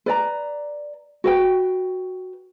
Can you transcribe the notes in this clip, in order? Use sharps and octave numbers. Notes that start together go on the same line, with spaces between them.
B4 D5 A#5
F#4 B4 G5